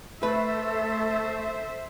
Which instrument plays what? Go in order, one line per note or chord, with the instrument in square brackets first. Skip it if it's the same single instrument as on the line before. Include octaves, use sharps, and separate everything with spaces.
[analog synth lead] A3 [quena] A4 [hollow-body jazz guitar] B4 [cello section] C5 E5